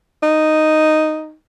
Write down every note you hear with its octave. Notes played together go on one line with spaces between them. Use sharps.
D#4